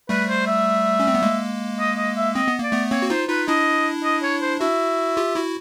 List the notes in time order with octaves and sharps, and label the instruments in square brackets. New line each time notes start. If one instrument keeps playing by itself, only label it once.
[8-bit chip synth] G3 A3 [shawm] B4
[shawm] C5
E5
[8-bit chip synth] C#4
C4
B3
G#3 A#3
[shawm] D#5
D#5
E5
[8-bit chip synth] C4 [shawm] D#5
[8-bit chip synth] B3
[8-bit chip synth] A#3 [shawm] D5
[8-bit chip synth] A3 B3
[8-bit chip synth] A#3 C4 [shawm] C#5
[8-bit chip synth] F#4
[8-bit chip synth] D#4 F4 [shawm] C5
[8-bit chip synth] D#4 F4 [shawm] B4
[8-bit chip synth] D4 E4 [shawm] D#5
[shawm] D#5
C#5
C5
[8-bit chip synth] E4 F#4 [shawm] E5
[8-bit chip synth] F4 G4
E4 F#4